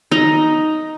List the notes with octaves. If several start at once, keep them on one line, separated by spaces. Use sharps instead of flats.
D#4 A#5